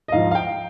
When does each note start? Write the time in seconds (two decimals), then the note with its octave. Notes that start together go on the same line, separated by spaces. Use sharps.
0.08 D#5
0.12 G#2 F3 F5
0.31 F5
0.35 G5